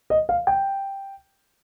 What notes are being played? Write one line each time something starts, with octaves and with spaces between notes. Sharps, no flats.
D#5
F5
G5